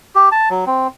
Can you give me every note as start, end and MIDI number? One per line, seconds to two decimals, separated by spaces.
0.15 0.29 67
0.32 0.49 81
0.50 0.65 54
0.66 0.87 60